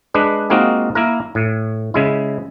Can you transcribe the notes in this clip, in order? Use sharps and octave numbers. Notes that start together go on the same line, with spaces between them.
G#3 D4 B4
G#3 A#3 C4 D#4 F4 F#4
A#3 E4 A#4
A2
C#3 G#3 E4